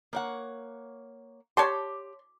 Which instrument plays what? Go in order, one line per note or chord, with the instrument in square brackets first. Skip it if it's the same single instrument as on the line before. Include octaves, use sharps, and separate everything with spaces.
[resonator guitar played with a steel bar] A#3 C#5 F#5
[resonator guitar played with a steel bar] G4 [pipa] C#5 A5 C6